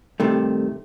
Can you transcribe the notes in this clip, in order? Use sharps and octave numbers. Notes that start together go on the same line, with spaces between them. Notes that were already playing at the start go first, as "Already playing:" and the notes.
G2 C3 D#3 A3